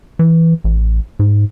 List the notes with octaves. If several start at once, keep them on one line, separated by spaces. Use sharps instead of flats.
E3
A1
G#2